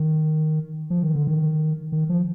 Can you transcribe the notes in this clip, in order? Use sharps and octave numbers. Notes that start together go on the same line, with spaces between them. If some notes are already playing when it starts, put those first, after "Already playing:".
Already playing: D#3
F3
D#3
D3
D#3
D#3
F3